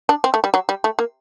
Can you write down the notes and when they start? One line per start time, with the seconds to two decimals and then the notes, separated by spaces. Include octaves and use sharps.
0.09 D4
0.24 C4
0.34 A3
0.44 G3
0.54 F#3
0.69 G3
0.84 A3
0.99 A#3